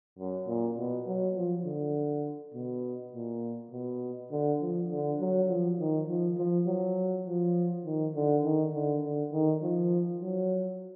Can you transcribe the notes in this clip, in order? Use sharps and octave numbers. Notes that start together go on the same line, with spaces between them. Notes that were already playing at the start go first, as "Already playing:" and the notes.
F#2
A#2
B2
F#3
F3
D3
B2
A#2
B2
D3
F3
D3
F#3
F3
D#3
F3
F3
F#3
F3
D#3
D3
D#3
D3
D3
D#3
F3
F#3